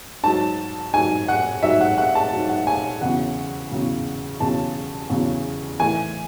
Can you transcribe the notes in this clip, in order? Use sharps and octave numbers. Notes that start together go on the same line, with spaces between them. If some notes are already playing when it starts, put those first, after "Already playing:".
G#2 F#3 A5
G#2 F#3 G#5
F#5
G#2 F#3 E5
F#5
F#5
A5
G#2 F#3
F#5
G#5
E2 C#3 F#3 F#5
E2 C#3 F#3
E2 C#3 F#3 A5
E2 C#3 F#3
A2 E3 G#5